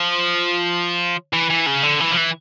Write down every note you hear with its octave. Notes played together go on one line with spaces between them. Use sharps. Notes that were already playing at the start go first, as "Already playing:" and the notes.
Already playing: F3
E3
E3
C#3
D3
E3
F3
E3